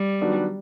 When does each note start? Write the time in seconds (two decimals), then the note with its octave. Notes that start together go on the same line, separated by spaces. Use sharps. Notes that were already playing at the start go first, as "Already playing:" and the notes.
Already playing: G3
0.21 D#3 F#3 B3 D4 F#4